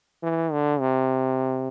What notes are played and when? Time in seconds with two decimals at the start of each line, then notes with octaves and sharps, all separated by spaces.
0.23 E3
0.52 D3
0.80 C3